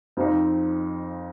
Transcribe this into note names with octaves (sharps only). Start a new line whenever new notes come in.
F2 F3 C4 D#4